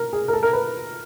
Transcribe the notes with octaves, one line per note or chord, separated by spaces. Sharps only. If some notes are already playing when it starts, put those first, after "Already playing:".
Already playing: A#4
G#4
A#4
A4
A#4
B4